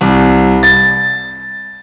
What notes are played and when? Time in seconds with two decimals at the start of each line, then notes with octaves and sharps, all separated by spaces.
0.01 C2
0.63 A6